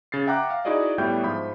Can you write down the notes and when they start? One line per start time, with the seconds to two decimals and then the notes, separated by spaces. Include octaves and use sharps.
0.12 C#3 A6 C7
0.27 E5 F#5 G5 A#5 D6 F#6
0.50 F5
0.65 D#4 E4 F#4 G#4 D5 D#5
0.98 A2 G3 B3 E4 G5 G6
1.23 G#2 F3 E5 B5 G6